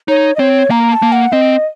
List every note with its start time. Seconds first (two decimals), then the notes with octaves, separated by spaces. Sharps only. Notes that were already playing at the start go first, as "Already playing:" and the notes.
0.08 D#4 C#5
0.36 D#5
0.39 C4 C#5
0.70 A#3 A#5
0.92 A5
1.02 A#3
1.12 F#5
1.32 C4 D#5